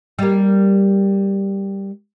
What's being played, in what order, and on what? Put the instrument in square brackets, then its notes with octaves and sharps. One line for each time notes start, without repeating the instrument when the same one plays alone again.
[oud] G3 A#3